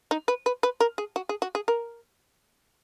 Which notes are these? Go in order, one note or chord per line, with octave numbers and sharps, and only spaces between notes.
D#4
B4
B4
B4
A#4
G#4
F#4
G#4
F#4
G#4
A#4